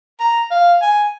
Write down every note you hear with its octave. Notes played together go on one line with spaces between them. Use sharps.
A#5
F5
G#5